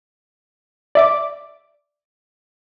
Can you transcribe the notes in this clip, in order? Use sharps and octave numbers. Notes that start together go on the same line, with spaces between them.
D5 E5 D6